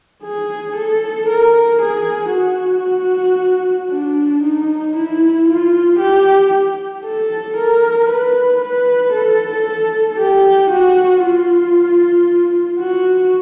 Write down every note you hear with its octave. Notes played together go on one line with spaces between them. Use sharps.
G#4
A4
A#4
G#4
F#4
D4
D#4
E4
F4
G4
A4
A#4
B4
B4
A4
G4
F#4
F4
F#4